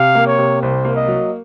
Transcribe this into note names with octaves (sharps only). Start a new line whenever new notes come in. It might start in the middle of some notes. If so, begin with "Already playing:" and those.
Already playing: C3 F5
A#3
C#5
C3
C2 C5
A#3
D#5
F#3